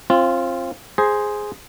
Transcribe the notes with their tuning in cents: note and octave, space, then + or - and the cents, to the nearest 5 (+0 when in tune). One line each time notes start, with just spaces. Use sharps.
C4 +25 F4 -10
G#4 +0 C5 +0 A#5 +25